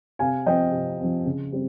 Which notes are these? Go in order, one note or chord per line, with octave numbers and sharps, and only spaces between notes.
C3 F5 G#5
F3 C4 D#5 G5
C3
F3 C4
C#3
G3 C4